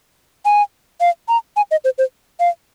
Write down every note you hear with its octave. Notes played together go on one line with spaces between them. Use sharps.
G#5
F5
A#5
G#5
D#5
C5
C5
F5